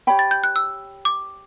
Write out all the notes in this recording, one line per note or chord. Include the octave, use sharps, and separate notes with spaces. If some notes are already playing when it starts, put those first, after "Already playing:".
G4 C#5 G5 B5
A6
G6
F#6
E6
D6